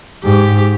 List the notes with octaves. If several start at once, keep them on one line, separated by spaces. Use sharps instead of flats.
G#2 G4